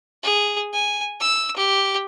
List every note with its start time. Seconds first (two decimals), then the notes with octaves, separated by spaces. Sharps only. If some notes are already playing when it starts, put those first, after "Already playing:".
0.23 G#4
0.73 G#5
1.20 E6
1.56 G4